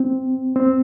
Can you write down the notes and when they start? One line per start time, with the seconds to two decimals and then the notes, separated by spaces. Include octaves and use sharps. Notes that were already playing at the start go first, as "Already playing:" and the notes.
Already playing: C4
0.56 C4